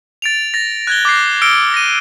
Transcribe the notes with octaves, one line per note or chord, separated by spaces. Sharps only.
A6 D7 F7
A6 A#6
F#6 G#6 G7
D6 F#6 G6 A#6 C7
E6 F6 A#6 C#7 D7 G7
A#6 D#7